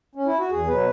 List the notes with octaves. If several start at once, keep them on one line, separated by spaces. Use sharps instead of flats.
C#4
E4
F#4
E2 G#4
B2 F#3 B4